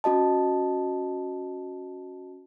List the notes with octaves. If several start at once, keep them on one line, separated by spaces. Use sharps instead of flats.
C#4 F#4 D#5 A5